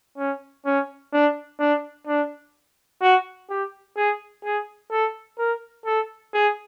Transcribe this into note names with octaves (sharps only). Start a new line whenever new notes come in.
C#4
C#4
D4
D4
D4
F#4
G4
G#4
G#4
A4
A#4
A4
G#4